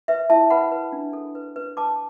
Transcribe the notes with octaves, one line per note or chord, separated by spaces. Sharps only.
B4 E5
E4 E5 A5
B4 F#5 B5
B4
D4
A4
B4
B4
B4 A5 D6